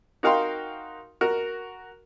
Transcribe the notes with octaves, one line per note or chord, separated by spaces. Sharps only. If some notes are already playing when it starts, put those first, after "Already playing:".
D#4 F#4 A#4 F5 G5 C6
F#4 A#4